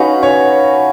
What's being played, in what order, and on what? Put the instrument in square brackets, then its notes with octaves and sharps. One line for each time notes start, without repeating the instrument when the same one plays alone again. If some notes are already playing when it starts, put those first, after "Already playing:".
Already playing: [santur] C#4 F#4 B4 F5 [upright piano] D#4
[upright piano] C#5